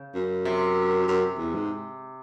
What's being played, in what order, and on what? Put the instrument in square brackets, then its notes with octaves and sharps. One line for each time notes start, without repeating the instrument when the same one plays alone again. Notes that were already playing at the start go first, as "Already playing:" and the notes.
Already playing: [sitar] C#3
[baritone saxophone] F#2
[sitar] C3
[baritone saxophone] F#2
E2
G#2